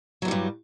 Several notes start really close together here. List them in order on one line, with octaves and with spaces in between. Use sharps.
F#3 E2 G3 G2